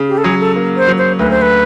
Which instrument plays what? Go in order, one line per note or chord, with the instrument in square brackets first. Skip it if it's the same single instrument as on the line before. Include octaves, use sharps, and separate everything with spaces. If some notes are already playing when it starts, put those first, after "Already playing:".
Already playing: [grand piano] C#3
[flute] G4
A4
[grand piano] F#3 [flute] G#4
[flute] A4
[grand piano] A#3
[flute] C5
[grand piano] F#3
[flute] C5
[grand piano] D2 [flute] B4
[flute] C5
B4